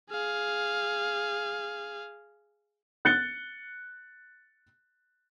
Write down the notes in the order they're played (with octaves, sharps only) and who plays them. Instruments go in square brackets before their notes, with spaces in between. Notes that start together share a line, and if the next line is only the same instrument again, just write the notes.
[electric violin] G#4 F5
[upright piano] F#6 A6 C#7 G7